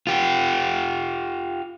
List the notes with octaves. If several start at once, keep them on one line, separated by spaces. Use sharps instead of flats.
F4 G4